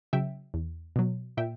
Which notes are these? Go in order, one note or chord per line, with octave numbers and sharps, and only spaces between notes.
C#3 F#3 E5 G5
E2
B2 F#3
A#2 E5 G5